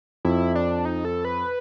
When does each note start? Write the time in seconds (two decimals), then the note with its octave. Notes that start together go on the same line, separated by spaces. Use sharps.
0.25 F2 E4
0.55 D4
0.85 D#4
1.05 A4
1.25 B4